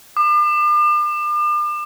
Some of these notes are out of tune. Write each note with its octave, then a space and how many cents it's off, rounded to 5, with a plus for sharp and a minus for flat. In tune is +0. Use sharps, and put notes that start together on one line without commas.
D6 +40